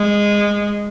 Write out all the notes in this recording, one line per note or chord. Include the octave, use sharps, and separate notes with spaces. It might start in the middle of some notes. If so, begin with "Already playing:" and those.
Already playing: G#3